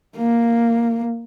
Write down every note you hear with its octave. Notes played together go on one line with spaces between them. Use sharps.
A#3